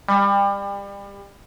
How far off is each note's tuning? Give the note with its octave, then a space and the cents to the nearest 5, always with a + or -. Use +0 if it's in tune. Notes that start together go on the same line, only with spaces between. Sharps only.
G3 +30